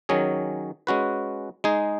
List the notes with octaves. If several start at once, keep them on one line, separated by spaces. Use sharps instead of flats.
D#3 F#3 C#4 G#4
G#3 C#4 F#4 B4
G#3 D#4 G#4